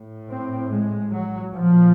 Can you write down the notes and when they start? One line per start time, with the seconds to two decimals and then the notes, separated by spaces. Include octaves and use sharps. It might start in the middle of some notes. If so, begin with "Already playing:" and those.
Already playing: A2
0.28 C4
0.70 G#3
1.11 F#3
1.53 A#2 F3